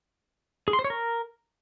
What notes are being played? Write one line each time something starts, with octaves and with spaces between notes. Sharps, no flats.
G#4
C6
C5
C#5
A#4